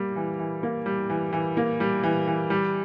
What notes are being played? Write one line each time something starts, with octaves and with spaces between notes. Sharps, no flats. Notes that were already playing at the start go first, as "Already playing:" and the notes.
Already playing: G3 A#3
E3
E3
A#3
G3
E3
E3
A#3
G3
E3
E3
G3